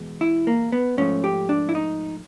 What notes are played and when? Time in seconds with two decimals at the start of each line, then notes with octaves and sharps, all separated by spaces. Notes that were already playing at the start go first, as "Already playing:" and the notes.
Already playing: E2 B2 G#3
0.21 E4
0.47 A#3
0.72 B3
0.97 G#2 F3 A3 C#4
1.24 G4
1.49 D4
1.69 E4
1.75 D#4